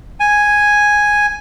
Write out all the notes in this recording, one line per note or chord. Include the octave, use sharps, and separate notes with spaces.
G#5